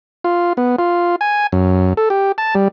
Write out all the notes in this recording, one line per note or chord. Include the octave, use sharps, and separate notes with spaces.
F4
B3
F4
G#5
F#2
A4
G4
A5
G3